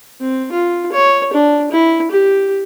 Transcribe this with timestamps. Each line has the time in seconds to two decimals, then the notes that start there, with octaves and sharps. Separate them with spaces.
0.20 C4
0.52 F4
0.92 C#5
1.33 D4
1.71 E4
2.11 G4